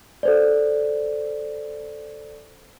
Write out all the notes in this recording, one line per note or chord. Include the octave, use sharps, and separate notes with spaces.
A4 C5 D5